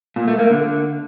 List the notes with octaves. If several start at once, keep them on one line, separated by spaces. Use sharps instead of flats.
A#2
A3
A#3
D3